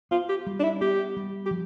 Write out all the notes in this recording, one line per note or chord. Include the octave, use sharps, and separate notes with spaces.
B3 F4
G4
G3
D4
E4
B3 G4
G3
G4
F3